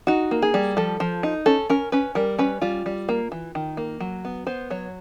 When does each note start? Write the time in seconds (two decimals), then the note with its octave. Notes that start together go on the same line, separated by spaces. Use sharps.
0.07 D#4 F#4
0.31 A#3
0.42 G#4
0.54 G3
0.77 F3 A4
1.00 F3
1.23 D#4
1.46 C#4 A4
1.70 C#4 A#4
1.92 C#4 B4
2.15 G3 A#4
2.39 C#4 B4
2.62 G3 F4
2.86 G3
3.09 A#3
3.32 E3
3.55 D#3
3.77 A#3
4.00 F#3
4.25 B3
4.47 B3 C5
4.70 F#3 C#5